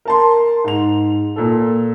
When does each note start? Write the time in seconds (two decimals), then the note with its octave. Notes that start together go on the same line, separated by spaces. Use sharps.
0.05 A#4 A5 C6
0.64 G#2 F7
1.36 A#2 A4